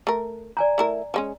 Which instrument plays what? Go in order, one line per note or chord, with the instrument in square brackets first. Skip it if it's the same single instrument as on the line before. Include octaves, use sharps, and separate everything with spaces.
[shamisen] A3 A#4
[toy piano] D5 G#5 A#5
[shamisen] A3 E4 A#4
F3 G#3 C#4